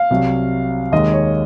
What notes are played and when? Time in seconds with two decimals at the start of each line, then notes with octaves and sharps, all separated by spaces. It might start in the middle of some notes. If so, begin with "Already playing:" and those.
Already playing: F5
0.10 C2 C3 F#3
0.92 D#2 D#3 G#3 D#5
1.13 C#5